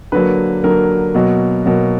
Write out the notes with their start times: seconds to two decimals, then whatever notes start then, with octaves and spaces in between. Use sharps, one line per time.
0.12 D3 F#3 A#3 B4
0.64 D3 F#3 A#3 A#4
1.14 B2 F#3 A#3
1.65 B2 F#3 A#3